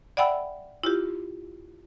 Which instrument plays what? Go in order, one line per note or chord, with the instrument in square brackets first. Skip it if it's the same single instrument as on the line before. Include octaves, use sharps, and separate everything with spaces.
[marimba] D5 E5 F#5 G5 B5 E6
E4 F4 G4